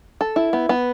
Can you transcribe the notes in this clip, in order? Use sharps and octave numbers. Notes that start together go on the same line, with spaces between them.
A4
E4
B3
B3